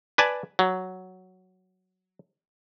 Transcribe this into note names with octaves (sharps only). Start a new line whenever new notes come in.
B4 D5 G#5 A5
F#3